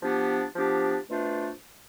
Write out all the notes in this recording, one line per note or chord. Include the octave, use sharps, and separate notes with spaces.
F3 B3 D4 G4
F3 B3 D4 G4
B2 A3 D4 F4 C5